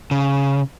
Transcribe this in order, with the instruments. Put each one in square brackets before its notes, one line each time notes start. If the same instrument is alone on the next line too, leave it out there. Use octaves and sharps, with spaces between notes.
[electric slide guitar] C#3